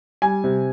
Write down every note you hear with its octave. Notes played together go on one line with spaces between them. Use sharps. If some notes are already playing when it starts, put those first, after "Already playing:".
G3 G#5
C3